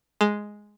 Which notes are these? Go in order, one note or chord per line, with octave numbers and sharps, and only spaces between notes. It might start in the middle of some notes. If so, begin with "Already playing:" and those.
G#3